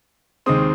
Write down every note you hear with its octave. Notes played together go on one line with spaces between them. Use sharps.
D#2 D#3 G#3 C4 D#6